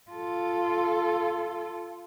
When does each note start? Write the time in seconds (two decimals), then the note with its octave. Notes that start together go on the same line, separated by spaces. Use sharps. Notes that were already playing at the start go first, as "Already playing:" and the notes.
0.11 F4 A4